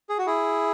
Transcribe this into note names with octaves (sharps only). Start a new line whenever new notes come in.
G#4
F#4
E4 G#4